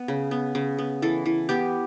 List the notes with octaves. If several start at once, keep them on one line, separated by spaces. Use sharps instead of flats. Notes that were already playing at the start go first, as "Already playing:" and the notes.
Already playing: B3
C#3
B3
C#3
B3
E3 A4
E3
B3 G4